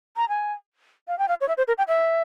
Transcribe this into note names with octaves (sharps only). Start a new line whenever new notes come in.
A#5
G#5
F5
G5
F5
C#5
E5
C5
A#4
G5
E5